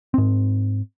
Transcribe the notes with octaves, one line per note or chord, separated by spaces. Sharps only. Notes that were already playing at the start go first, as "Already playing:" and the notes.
G#2 C4